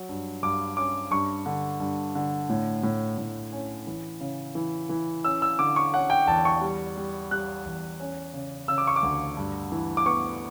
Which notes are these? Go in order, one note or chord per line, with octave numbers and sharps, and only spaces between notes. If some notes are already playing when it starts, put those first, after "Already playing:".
Already playing: F#3
G2
G2 D6
C#4 D6
G2 C#6
D3
G2
D3
A2
A2
A2
C#4
E3
C#3
E3
E3
C#4 E6
E6
D3 D6
C#6
C#4 F#5
G5
E2 A5
C#6
G3
G3
G3 F#6
E2
C#4
C#3
C#3 E6
D6
C#6
D6
D2
G2
E3
D6
B3 C#6